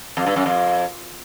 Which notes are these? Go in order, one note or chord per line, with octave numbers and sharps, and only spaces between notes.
F2
G2
F#2
F2